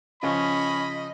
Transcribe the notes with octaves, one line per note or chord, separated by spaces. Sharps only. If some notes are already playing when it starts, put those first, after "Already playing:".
C#3 F3 C#4 D#5 B5